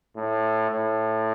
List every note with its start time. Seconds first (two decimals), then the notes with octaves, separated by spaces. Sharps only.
0.16 A2
0.71 A2